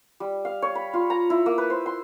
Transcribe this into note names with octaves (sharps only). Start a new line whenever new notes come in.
G3
F5
C#5
B5
F4
A#5
E4
A#3
B4
C5
C6